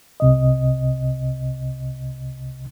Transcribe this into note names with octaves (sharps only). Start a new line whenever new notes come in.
C2 C3 D#5